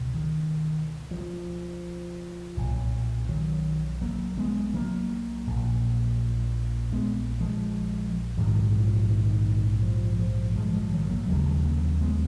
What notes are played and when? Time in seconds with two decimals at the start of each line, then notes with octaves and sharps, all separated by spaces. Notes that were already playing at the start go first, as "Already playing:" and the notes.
Already playing: C#2 B2
0.14 D#3
1.11 F3
2.57 B1 A#2
3.29 D#3 F#3
4.02 F#3 A#3
4.37 G#3 B3
4.74 F#3 A#3
5.47 A#1 A#2
6.92 G#3 B3
7.40 F3 G#3
8.38 A#1 G#2 D#3 F#3
8.74 F3
9.10 D#3
9.83 F3
10.19 F3
10.55 F3 G#3
10.73 F3 G#3
10.91 D#3 F#3
11.10 F#3 A#3
11.27 F1 D#2 C#3 F3 G#3
11.64 F#3 A#3
12.01 G#3 B3